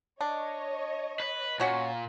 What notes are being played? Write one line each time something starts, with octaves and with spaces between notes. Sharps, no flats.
D4 C#5 D#5
B4
A#2 C#4 F#4 C#5